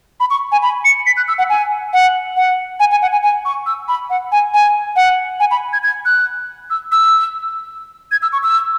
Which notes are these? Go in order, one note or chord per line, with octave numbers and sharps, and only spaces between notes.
B5
C#6
G#5
B5
C#7
B6
F#6
E6
F#5
G#5
F#5
F#5
G#5
G#5
F#5
G#5
G#5
C#6
E6
B5
F#5
G#5
G#5
F#5
G#5
B5
G#6
G#6
F#6
E6
E6
G#6
E6
C#6
E6